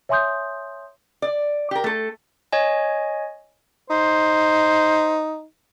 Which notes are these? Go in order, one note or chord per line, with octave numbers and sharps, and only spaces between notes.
C#5 E5 G#5 C6 D#6 G6
D5
G4 A#4
A3 A4
C#5 D#5 G#5
D#4 C5